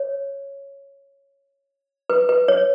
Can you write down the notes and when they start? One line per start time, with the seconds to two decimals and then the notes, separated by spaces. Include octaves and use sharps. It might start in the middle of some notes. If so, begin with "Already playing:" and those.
Already playing: C#5
2.10 B4
2.29 B4
2.48 C#5